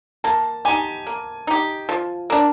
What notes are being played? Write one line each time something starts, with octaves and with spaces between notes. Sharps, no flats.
A#3 A5
D#4 G4 G#5
A#3
D#4 G4
F3
A#3 D4